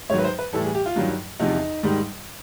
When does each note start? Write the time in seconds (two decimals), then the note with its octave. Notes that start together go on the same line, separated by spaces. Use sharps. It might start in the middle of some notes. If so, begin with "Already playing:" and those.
0.10 G#2 D#3 F#3 C#5
0.19 B4
0.24 C5
0.39 B4
0.53 A2 E3 G3 A4
0.64 G#4
0.75 G4
0.86 F4
0.96 G2 D#3 F#3
1.40 E2 C3 F3 D#4
1.83 G#2 D#3 G3